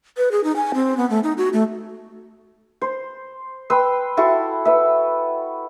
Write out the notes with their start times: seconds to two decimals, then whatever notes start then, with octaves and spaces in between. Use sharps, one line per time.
0.17 B4
0.31 G#4
0.44 D#4
0.56 G#5
0.74 C4
0.97 B3
1.10 A3
1.23 D#4
1.38 F#4
1.53 A3
2.81 C5
3.70 B4 G5 C6 E6
4.17 E4 F#4 A4 C6
4.65 B4 E5